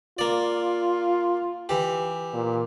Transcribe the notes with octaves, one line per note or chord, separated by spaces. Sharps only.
A#3 F4 D5
E3 G4
A#2